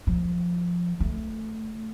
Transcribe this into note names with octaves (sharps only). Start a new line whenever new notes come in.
F3
A3